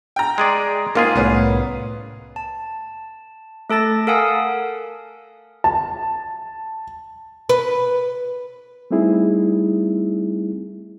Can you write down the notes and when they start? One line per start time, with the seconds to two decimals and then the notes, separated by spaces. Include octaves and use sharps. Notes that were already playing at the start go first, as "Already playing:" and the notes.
0.16 G5 A#5
0.38 G#3 G#4 D5
0.95 G#2 A#3 F4 G#4
1.15 C2 A2 B3 C#4 B4
2.36 A5
3.70 A3 A4 A5 A6 A#6
4.07 A4 A#4 F5 F#5 G#5 D#6
5.64 A5
7.49 B4
8.91 G3 A3 C4 D#4 E4 G#4